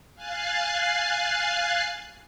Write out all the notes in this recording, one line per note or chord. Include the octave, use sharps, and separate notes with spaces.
F5 G#5 F#6 A6 C7